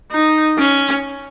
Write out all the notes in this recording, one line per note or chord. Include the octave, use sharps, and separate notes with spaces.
D#4
C#4